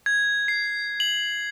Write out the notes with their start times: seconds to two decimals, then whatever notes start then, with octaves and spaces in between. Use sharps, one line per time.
0.06 G#6
0.48 C7
1.00 F#7